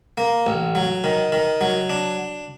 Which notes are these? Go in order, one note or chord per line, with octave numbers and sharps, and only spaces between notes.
A#3
A1
F#3
D#3
D#3
F#3
D4